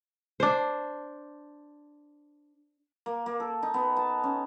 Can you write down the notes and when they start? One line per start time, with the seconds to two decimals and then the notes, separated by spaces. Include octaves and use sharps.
0.40 D4 C5
3.06 A#3
3.26 A#3
3.40 A4
3.63 D#4
3.74 B3
3.97 A5
4.24 C#4